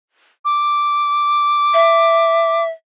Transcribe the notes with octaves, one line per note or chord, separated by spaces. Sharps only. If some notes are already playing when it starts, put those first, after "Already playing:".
D6
E5